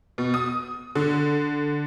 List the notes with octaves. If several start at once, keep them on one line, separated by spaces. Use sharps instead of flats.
B2
D#6
D3